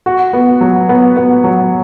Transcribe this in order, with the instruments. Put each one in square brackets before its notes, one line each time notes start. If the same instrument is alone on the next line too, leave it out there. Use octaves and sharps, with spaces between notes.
[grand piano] F#4
B3
F#3
B3
B3
F#3